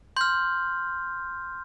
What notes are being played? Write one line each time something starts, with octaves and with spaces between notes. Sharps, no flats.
C6 F6 G6